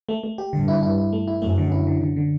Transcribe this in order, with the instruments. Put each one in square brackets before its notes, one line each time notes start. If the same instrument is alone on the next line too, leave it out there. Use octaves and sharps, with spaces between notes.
[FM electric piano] A3
A3
G4
[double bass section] G2 [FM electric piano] D3
[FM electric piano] E4
E4
E4
A3
E4
[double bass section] F#2 [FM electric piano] A3
[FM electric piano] D3
E4
D3
D3
D3